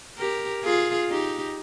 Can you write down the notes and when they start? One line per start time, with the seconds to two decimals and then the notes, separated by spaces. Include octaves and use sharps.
0.18 G4 A#4
0.64 F4 G#4
1.10 D#4 G4